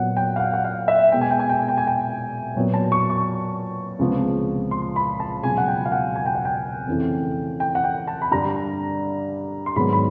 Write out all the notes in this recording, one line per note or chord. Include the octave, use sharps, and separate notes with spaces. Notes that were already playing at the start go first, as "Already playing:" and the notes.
Already playing: A#2 F#3 B3 F#5
G5
F5
F#5
F#5
F5
E5
B2 G#3 B3 G5
G#5
G5
G#5
G5
G#5
G5
G#5
G5
A#2 F#3 B3
A5
C#6
C#6
C#2 C3 F3 G#3 B3
C6
B5
A5
C#2 B2 F#3 G#5
F#5
G5
F5
F#5
G#5
G5
F#5
G5
F2 C#3 E3 A3
G5
F#5
G5
A5
B5
G2 D3 G3 A#5
C6
G#2 D#3 F#3 B3 B5
B5